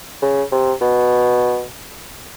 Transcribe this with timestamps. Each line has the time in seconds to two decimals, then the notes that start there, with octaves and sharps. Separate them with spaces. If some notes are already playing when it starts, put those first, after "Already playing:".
0.22 C#3
0.52 C3
0.81 B2